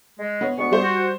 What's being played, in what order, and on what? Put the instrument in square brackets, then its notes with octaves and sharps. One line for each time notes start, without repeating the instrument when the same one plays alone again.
[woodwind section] G#3
[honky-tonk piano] B3 C#5
[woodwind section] D2 B3 C#6 [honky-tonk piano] G#3
[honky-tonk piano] G3 C5
[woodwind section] F#4